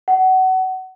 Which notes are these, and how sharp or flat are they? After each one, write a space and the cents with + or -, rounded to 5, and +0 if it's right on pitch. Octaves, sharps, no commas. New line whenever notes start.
F#5 +25